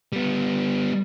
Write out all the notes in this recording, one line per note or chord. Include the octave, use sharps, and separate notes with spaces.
G3 B3